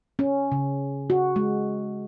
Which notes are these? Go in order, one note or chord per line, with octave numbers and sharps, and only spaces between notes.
C#4
C#3
F#4
G#3